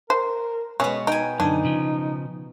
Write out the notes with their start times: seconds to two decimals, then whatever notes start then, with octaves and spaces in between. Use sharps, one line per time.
0.10 A#4 C5
0.80 B2 G#3 B3 C#4
1.07 D#4 G5 G#5
1.40 F#2 D3 D4 D#4 G#5
1.65 C#3 F3